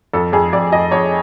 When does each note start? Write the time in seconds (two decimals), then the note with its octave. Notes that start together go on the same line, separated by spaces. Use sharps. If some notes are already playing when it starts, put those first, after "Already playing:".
0.13 F2 A4
0.33 F2 G#4
0.53 F2 D5
0.72 F2 D#5
0.91 F2 C#5